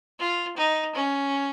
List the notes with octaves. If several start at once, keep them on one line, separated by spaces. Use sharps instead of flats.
F4
D#4
C#4